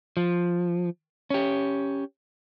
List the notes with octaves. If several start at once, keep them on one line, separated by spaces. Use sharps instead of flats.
F3
C#4 G4